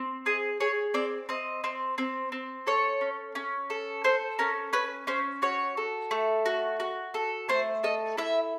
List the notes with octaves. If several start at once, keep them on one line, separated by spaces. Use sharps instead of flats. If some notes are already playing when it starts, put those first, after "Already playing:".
Already playing: C4
G#4 D#5
G#4 C#5
C4 D5
C4 D#5
C4
C4
C4
A4 C#5
C#4
C#4
A4
A4 C5
C#4 A#4
C#4 B4
C#4 C5
F#4 C#5
A4
A3
F#4
F#4
A4
A3 C5
A4 D#5
E4 E5